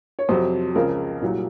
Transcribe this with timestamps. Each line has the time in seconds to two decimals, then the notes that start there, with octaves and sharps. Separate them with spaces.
0.19 C#5
0.29 F2 C3 F#3 C5
0.75 C#2 C#3 F3 A#4
1.21 C2 A#2 F#3